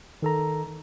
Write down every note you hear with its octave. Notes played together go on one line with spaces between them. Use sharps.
D#3 A4 A#5